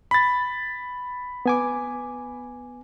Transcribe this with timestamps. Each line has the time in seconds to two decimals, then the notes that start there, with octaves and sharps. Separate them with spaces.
0.11 B5 A6
1.46 B3 G#5 D6